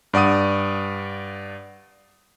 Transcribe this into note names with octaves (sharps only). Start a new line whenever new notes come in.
G2 D5 F#5 D#6 D#7